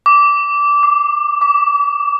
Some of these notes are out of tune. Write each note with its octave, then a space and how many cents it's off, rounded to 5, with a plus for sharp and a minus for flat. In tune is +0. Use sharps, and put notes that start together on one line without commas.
D6 -15
D6 +20
D6 -40